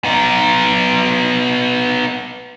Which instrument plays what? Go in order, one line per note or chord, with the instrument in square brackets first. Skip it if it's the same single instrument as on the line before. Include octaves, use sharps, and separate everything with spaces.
[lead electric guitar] B3 D#4